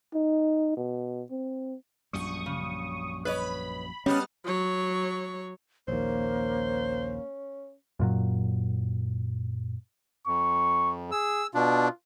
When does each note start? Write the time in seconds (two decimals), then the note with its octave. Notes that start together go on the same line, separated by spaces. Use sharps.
0.14 D#4
0.77 B2
1.30 C4
2.13 A#1 F#2 G3 C#6 D#6
2.46 C#3
3.25 B4 C#5 D#5 B5
4.06 G3 G#3 B3 C#4 A5 D#6 F6
4.45 F#3 C#5
5.88 A#1 D#2 A#3 C#4 C5
8.00 F#2 A#2 F#3
10.27 F2 C#6
11.12 G#4 E6
11.55 B2 D4 F4